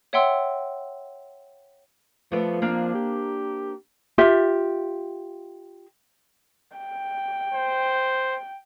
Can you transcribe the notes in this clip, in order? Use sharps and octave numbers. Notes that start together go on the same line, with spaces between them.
C#5 E5 F#5 G5 C6 E6
F3 A3 B3 D5
A#3 C4 D4
G4
F4 G4 E5
G5
C5